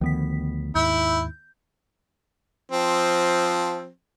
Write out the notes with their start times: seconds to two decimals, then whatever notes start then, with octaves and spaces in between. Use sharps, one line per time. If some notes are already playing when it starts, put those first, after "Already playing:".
0.01 D2 D#3 F3 B3 B6
0.75 D#2 G#2 E4 G6
2.71 F3 C4